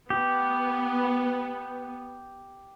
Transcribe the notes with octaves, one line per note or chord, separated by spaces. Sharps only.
B3 G4